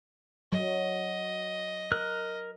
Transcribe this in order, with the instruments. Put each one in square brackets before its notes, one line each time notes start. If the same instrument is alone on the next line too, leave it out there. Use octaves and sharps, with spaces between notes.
[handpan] F#3 [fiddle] D#5
[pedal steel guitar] A#4 F#6